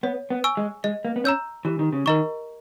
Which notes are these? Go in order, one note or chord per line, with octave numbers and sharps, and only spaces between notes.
B3 C#5
B3
G#5 C#6 E6
G#3
G#3 D#5
A#3
B3
C#4 A#5 E6 G6
E3 G4
D#3
C#3
D#3 A#4 D#5 A#5 C#6